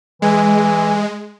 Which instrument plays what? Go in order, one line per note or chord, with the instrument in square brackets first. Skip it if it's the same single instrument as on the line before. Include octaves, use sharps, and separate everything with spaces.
[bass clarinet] E3 [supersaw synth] G#3